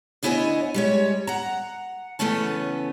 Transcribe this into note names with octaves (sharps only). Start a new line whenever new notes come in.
D2 B3 E4 C#5 D#5 G#5
G3 G#3 C#5
F#5 A#5
C#3 E3 A3 B3 C#4 A5